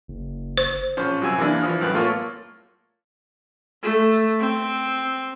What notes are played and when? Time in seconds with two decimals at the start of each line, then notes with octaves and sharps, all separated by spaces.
0.08 F#1
0.57 C5
0.97 A#1 C#4 C5
1.22 F#2 C3 G#5 E6
1.38 E3 A#3 D4
1.61 E3 F3 D#6 F6
1.81 F#2 A2 B4
1.95 A3 A#3 F4 C#5
3.83 A3
4.40 C4